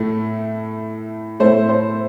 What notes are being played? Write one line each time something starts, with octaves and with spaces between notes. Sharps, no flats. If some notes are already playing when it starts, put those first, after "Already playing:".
Already playing: A2 A3
A2 A3 C5
C5